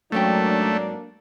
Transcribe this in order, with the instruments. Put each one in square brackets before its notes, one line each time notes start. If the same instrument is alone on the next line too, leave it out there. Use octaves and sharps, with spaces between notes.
[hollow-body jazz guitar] G#2 C#4 G5 [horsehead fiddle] F#3 [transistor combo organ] A3 [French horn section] A#3 D4